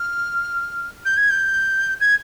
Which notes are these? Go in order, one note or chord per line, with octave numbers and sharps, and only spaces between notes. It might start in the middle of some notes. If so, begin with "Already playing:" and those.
Already playing: F6
G6
G#6
G6
G#6